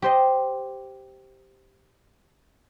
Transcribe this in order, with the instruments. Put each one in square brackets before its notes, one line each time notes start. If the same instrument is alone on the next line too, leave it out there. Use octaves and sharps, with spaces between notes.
[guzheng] G4 C5 D#5